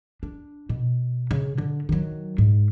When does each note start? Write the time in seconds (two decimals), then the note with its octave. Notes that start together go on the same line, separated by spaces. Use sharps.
0.23 D4
0.69 B2
1.31 C#3
1.58 D3
1.89 D#3 F#3
2.38 G#2